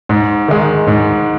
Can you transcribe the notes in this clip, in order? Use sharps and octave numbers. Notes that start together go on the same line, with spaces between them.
G#2
D#3 G#3
G#2